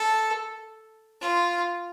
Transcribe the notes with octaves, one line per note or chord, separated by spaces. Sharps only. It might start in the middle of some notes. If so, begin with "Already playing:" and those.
Already playing: A4
F4